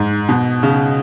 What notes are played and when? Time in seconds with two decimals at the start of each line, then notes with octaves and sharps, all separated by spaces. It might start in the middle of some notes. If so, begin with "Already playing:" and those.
Already playing: G#2
0.29 B2
0.63 C#3